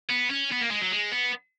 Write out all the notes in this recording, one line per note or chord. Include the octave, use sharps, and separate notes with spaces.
B3
C#4
B3
A#3
G#3
F#3
G#3
B3